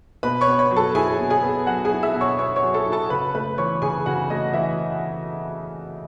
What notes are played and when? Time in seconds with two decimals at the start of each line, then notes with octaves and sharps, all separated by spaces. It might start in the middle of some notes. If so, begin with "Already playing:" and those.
0.23 B2 B4 B5
0.41 C#5 C#6
0.47 B3
0.59 C#5 C#6
0.71 F#3
0.76 A4 A5
0.95 E4 G#4 G#5
1.19 B2
1.30 G#4 G#5
1.43 B3
1.66 F#3 F#4 F#5
1.85 G#4 G#5
1.91 E4
2.03 E5 E6
2.15 B2
2.21 C#5 C#6
2.38 B3 C#5 C#6
2.56 C#5 C#6
2.63 F#3
2.74 A4 A5
2.86 E4
2.92 A4 A5
3.10 C#3 B4 B5
3.34 A3 B4 B5
3.58 E3 C#5 C#6
3.82 C#3 G#4 G#5
4.06 C#3 F#4 F#5
4.30 A3 D#5
4.53 E3 E5